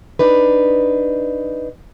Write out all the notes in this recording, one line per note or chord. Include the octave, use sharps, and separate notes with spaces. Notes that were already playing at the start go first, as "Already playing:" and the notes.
D4 D#4 B4